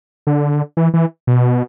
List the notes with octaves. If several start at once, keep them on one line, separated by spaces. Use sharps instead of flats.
D3
E3
E3
B2